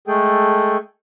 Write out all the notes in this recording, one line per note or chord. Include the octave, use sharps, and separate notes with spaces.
G#3 A3 G#4 A4 G5